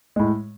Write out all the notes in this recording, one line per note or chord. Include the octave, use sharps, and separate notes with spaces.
A2 G#3